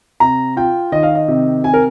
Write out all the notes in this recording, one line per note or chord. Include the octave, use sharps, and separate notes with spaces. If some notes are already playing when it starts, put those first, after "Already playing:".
C3 A#5
F4 G5
D#3 D#5
F5
D#5
C3
C3 G#5
A#4